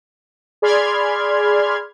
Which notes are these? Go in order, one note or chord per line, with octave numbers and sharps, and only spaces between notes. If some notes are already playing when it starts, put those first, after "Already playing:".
G#4 D5 B5 C6 F6 G#6